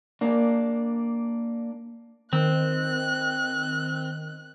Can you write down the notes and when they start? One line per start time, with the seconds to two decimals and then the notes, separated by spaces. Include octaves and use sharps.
0.21 A#3 D4
2.33 D#3 C4 F#6